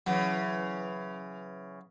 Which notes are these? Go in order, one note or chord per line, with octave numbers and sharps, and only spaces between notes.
C#3 E3 F#3